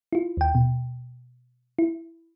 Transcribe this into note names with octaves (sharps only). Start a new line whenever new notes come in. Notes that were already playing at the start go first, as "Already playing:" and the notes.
E4 F4
D#2 G5
B2
E4